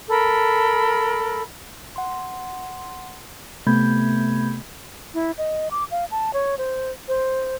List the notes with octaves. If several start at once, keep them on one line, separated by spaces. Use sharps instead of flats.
A4 A#4 B5
F#5 C6
C3 A3 B3 B5 G6 G#6
E4
D#5
D6
F5
A5
C#5
C5
C5